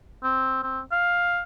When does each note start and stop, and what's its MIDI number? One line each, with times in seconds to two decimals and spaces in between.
0.23 0.58 60
0.63 0.80 60
0.92 1.42 77